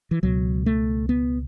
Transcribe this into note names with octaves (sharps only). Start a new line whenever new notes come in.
E3
C#2 B2 F#3
A3
B3